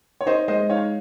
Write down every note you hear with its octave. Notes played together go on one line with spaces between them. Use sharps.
C#5
D#4 C5 D#5
G#3 C5 D#5
D#4 C#5 F5